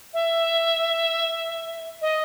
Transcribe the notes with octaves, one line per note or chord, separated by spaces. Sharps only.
E5
D#5